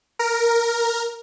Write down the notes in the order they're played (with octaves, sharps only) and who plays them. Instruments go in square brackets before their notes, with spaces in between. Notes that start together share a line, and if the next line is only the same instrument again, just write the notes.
[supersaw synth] A#4